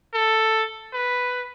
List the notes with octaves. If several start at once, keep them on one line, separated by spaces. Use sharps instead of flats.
A4
B4